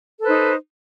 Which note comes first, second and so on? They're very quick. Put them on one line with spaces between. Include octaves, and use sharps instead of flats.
A4 B4 C5 D#4